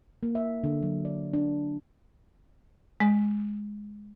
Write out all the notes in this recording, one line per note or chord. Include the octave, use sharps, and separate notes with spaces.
A#3
E5
D3
F#3
D5
D4
G#3